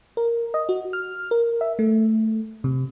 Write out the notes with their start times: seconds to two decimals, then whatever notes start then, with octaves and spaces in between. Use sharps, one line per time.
0.17 A#4
0.54 D#5
0.69 F#4
0.93 F6
1.31 A#4
1.61 E5
1.79 A3
2.64 C3